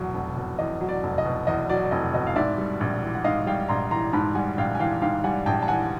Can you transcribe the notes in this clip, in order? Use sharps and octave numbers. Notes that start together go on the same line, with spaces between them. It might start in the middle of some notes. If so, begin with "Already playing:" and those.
Already playing: F1 E2 B2 F#3
F1
B2
E2 D#5
F#3
D5
F1
D#5
B2
E2 D#5
F#3 D5
D5
F1 D#5
B2 D#5
F5
G#2 D5 E5
G3
A#1
E3
F#5
G#2 D#5 F5
G3 F5 G5
A#1 A#5 C6
E3 A#5 C6
G#2 A5 B5
G3 F#5 G#5
A#1 F5 G5
G#5
E3 F5 G5
G#2 F5 G5
G3 F#5 G#5
A#1 G5 A5
A5
E3 F#5 G#5